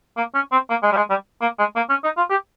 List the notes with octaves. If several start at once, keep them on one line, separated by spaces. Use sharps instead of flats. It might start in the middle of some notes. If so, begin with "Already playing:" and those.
A#3
C#4
C4
A#3
G#3
G3
G#3
G3
A#3
G#3
A#3
C#4
D#4
F4
G4